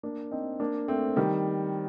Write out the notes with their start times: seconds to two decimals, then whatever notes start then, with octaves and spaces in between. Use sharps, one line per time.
0.03 A#3 D4
0.31 C4 D#4
0.60 A#3 D4
0.88 A3 C4
1.16 D#3 G3